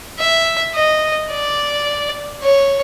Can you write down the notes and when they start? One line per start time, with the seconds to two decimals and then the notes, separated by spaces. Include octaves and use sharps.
0.19 E5
0.75 D#5
1.31 D5
2.43 C#5